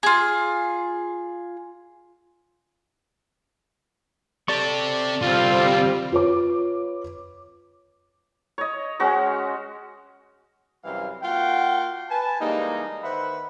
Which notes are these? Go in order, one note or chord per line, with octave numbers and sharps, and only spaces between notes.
F4 G#4
C4 G4 A4 D5 C#6
C2 D3 G3 C4 F4
F4 B4 C#5 D6
C#5 D#5
G#3 C#4 F#4 C#6
F#2 C3 E3 G3 F5
A#3 F4 F#4 F#5 G5
B4 G#5 A5
E3 G3 G#3 A#3 D#4
D#3 B4 C5 E5 F#5 B5